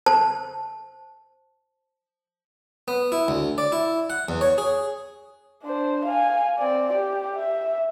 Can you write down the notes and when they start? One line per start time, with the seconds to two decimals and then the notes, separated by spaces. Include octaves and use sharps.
0.06 C5 A5
2.88 B3
3.12 E4
3.28 D2
3.58 D5
3.72 E4
4.10 F#5
4.29 E2
4.41 C#5
4.58 G#4
5.63 D4 C5
6.05 F5 G#5
6.59 C4 D5
6.93 G4
7.36 E5